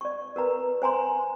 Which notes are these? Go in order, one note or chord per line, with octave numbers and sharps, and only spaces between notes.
D5 C#6
A#4 B4 A#5
C5 G#5 A#5 C6